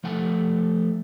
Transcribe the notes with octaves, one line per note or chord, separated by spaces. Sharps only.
F3 A3 F#5 G#5